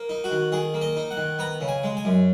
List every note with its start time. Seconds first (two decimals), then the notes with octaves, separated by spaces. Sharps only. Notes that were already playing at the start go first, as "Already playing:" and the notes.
Already playing: A#3
0.09 D#4
0.24 F#4
0.31 D#3
0.52 D#3 G#4
0.74 A#3
0.81 D#5
0.96 D#4
1.11 F#5
1.17 D#3
1.39 B3 A#5
1.61 C#3
1.68 G#5
1.83 G#3
1.97 G#5
2.05 F#2